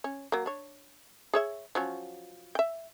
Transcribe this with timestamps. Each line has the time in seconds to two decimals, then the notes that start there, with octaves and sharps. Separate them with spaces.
0.04 C#4
0.32 F#3 A#3
0.46 D4 C#5
1.34 G#4 C#5 E5
1.75 F3 F#3 C#4
2.55 E5 G5